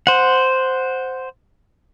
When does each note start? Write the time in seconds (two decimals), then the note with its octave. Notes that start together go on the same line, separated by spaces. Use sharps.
0.07 C5 F#5